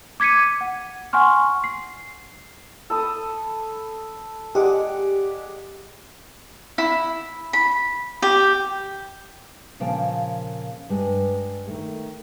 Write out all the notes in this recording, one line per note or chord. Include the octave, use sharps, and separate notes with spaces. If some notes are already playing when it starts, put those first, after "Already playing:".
D6 G#6 B6 C#7 D#7
F#5
F#5 G#5 C6 C#6 F6
C7
A4 B5 D#6
G#3 G4 D5 F#5
E4
B5
G4
A#2 C#3 F3 A#3 G5 A5
G2 G#3
D#3 A3